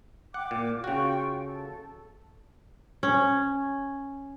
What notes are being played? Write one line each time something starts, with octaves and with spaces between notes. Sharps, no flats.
F#5 G5 D6
A#2
C#3 F4 F#4 G5 C#6
A4
C#4